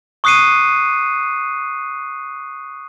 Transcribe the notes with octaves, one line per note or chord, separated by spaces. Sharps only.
C#6 D#6 F#6 C7 C#7 D#7